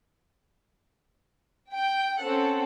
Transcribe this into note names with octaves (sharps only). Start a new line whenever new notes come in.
G5
C4 C#4 A4 F#5